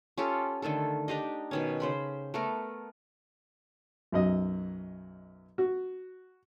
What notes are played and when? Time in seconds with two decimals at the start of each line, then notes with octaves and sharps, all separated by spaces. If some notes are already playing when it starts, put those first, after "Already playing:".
0.18 C#4 F4 G4 A4
0.62 D3 D#3 A3 A4
1.08 D4 D#4 G4 D#5
1.51 B2 D#3 C#4
1.80 C#3 C5 B5
2.34 A3 B3 A#4
4.12 B1 F#2 D#5
5.58 F#4